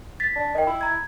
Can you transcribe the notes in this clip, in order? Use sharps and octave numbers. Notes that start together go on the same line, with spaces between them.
A6 B6
D4
D#3 D#5 G5
E4
A#5 G#6